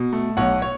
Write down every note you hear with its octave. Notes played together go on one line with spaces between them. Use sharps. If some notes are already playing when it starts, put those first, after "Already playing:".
Already playing: B2
A3
B1 C#5 F#5
C#5